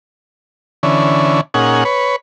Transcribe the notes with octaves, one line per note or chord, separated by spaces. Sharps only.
D3 E3 C#4
A#2 C#4 D#4 G#4 F#5
B4 C#5